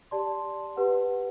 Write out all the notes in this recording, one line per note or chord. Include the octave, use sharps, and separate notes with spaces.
G4 D5 A5 C6
G4 B4 F#5